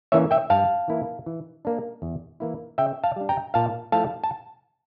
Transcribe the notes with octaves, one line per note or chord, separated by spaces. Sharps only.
E3 A#3 C#4 E4 C#5 E5
E5 G5
G2 F5 A5
E3 A#3 E4
E3
A#3 D4
E2
E3 A#3 E4
C#3 E5 G5
F5 A5
G3 D4
G5 A#5
A#2 F5 A5
F3 A3 E4 F5 A5
A5